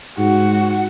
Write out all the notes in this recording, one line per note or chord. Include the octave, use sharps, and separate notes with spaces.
G#2 F#4